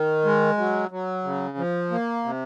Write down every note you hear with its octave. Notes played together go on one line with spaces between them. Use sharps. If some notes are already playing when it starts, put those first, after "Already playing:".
Already playing: D#3
G#3
F#3
F#3
C#3
F3
A#3
C3